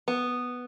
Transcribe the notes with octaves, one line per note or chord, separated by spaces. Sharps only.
B3